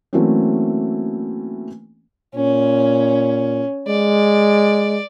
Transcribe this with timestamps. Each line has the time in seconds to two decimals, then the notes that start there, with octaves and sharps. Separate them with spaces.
0.13 E3 F#3 A3 A#3 C4 C#4
2.35 A#2 C#4
3.88 G#3 D5